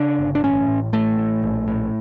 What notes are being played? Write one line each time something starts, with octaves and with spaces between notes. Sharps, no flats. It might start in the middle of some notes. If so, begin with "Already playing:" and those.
Already playing: C#3 D4
G1
D4
A1 C#4
A2
A1 A3
A2
A#1
A2